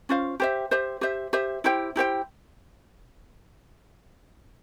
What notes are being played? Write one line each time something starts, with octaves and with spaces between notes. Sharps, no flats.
C#4 F4 C5 F5
G4 C5 E5
G4 C5 E5
G4 C5 E5
G4 C5 E5
E4 G4 C5 G5
E4 G4 C5 G5